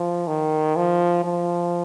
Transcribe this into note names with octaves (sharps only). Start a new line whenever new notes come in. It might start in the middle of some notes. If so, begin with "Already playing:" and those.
Already playing: F3
D#3
F3
F3